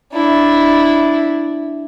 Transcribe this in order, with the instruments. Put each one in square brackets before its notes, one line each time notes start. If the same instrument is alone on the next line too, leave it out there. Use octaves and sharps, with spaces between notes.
[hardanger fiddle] D4 E4